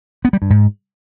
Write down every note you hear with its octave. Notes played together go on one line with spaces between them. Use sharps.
B3
G3
G2
G#2